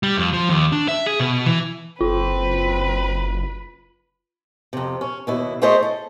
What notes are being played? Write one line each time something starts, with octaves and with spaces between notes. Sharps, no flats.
G3
F2
F3
D#2
D4
E5
G#4
B2
E3
F#1 C4 F4 B4
F2 C3
C#4
D#2 B2 E4
A3 E4 G#4 C5 C#5 D#5
A4